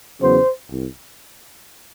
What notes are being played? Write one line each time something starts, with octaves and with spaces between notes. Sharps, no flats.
E2 C#3 F#3 B3 C5
C2